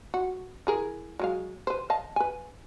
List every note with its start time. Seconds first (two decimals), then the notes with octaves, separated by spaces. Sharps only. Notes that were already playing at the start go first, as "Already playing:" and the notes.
0.14 F#4
0.67 E3 G#4 A#4
1.19 F#3 G#3 F5
1.67 B4 C5
1.90 D#5 F5 A5
2.16 B4 G#5